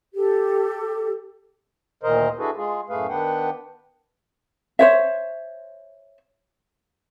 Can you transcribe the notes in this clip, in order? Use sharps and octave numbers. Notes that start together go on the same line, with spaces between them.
G4 A4
D2 A#2 D#3 A#4 C5 D#5
D4 E4 F#4 G#4 A4 B4
G#3 F4 G#4
F#2 A2 A3 G#4 B4 F5
D#3 B3 D4 B4 F#5 G5
C5 C#5 E5